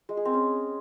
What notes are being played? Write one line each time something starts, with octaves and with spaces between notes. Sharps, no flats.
G#3
G#4
C4
C#4